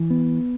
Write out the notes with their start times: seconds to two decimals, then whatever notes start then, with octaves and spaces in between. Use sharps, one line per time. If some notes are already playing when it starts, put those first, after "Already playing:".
Already playing: E3
0.10 B3